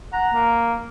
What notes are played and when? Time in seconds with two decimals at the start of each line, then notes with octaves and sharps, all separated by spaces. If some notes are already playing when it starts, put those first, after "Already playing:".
0.13 F#5 A#5
0.34 A#3